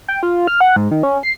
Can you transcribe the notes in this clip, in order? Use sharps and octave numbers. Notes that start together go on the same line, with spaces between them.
G5
F4
F6
F#5
G#2
D#3
C#4
C7